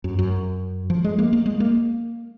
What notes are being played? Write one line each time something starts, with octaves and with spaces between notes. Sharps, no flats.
F#2
F#2
F3
G#3
A#3
A#3
G#3
A#3